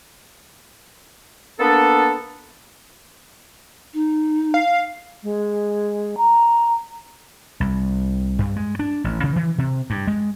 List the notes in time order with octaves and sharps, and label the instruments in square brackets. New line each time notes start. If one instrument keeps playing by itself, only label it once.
[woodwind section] A#3 B3 D4 A4
[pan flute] D#4
[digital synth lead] F5
[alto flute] G#3
A#5
[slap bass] C2
G2
G#3
D4
A1
C#3
E3
C3
G2
G#3